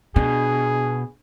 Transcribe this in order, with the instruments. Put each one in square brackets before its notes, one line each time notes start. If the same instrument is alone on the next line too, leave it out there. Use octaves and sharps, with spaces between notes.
[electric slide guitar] B2 [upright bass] D4 [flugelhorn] G#4